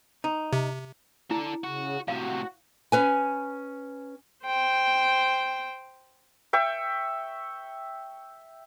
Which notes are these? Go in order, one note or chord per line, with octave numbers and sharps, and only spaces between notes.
D#4
C3
D4 E4 A4
C#3 F#4
A2 C3 F#4 F5
C#4 B4 G#5
C5 G5
E5 G5 C#6